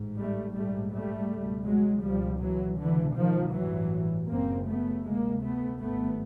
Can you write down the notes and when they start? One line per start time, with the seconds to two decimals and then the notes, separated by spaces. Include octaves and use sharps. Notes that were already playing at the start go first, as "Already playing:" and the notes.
Already playing: A1 G#2
0.17 G3 A3
0.55 A#1 G#2 G3 A3
0.92 G3 A3
1.30 C#2 B2
1.67 F#3 G#3
2.04 C#2 B2 F3 G3
2.42 E3 F#3
2.79 C#2 B2 D3 E3
3.16 D#3 F3
3.54 A1 G2 E3 F#3
4.29 F#1 F#2 C#3 A#3 C4
4.66 A3 B3
5.03 D2 C3 G#3 A#3
5.40 A3 B3
5.78 G#1 G2 A3 B3